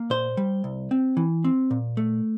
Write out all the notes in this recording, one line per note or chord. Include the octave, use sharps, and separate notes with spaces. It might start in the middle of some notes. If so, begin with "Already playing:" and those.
Already playing: A#3
A#2 C5
G3
C2
C4
E3
C4
A#2
A3